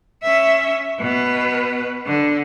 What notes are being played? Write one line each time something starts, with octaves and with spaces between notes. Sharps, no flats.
C#4 E5
B2 B4
D3